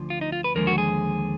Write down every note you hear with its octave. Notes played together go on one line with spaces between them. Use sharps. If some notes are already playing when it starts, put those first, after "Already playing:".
Already playing: D2 D3 F3
F4
D#4
F4
B4
D#2 D3 F3 G#3 A#4
F#4
G#4